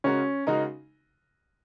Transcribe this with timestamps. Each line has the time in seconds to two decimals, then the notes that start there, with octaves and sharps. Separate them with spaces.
0.04 C#3 G#3 C#4 F#4 A#4
0.47 C#3 G#3 D#4 F#4 A#4